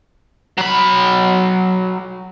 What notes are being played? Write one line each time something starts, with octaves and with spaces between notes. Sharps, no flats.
F#3 B5